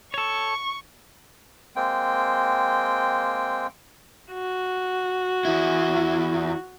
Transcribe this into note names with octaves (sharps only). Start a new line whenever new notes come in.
A4 C#5 C#6
G#3 A#3 C4 G5
F#4
E2 E4